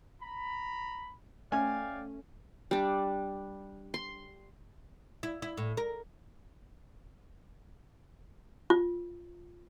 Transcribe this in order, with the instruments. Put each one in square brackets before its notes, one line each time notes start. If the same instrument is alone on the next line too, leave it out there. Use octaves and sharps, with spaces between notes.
[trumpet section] A#5 B5
[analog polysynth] A3 C#4 [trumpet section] D5 F5 G5 [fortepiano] G#5
[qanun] G3 D4
C6
[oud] E4
E4
A2
A#4
[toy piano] F4